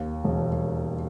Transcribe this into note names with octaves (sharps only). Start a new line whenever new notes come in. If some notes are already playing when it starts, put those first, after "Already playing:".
Already playing: D#2
E1